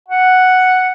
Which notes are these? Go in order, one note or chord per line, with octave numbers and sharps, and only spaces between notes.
F#5